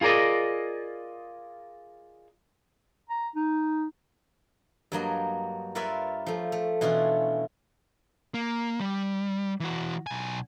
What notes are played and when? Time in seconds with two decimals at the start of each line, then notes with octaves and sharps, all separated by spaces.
0.01 F4 G#4 A#4 D5 D#5
3.10 A#5
3.35 D#4
4.92 G2 F#3 A#3 D#5
5.75 F4 A#4 B4 C#5 D5 E5
6.26 F3 A3
6.52 A3
6.81 B2 E3 C#4 D4 E4 F4
8.34 A#3
8.80 G3
9.60 E3 F#4
10.07 B1 G#5